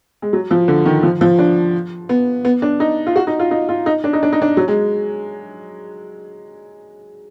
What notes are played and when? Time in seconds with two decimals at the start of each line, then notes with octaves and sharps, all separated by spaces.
0.22 G#3
0.33 F#3
0.51 F3
0.68 D3
0.86 D#3
1.03 F3
1.21 F3
1.39 D4
2.09 B3
2.45 B3
2.62 D4
2.80 D#4
3.07 F4
3.16 F#4
3.27 D#4
3.40 F4
3.51 D#4
3.69 F4
3.86 D#4
4.04 D4
4.13 D#4
4.23 D4
4.32 D#4
4.42 D4
4.57 F#3
4.68 G#3